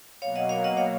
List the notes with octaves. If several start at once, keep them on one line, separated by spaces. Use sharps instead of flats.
B2 F#3 A#3 C#5 F5
D#5 F#5
C#5 F5
D#5 F#5
C#5 F5